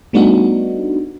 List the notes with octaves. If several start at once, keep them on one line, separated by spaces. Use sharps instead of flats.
G3 A3 B3 D4 D#4 F#4